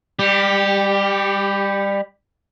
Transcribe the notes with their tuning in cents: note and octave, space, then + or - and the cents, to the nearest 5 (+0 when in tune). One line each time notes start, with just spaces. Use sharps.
G3 +25 G4 +0